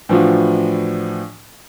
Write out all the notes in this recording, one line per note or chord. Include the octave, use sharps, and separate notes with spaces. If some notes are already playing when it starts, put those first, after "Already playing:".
A2 E3 F3 D4 F4 F#4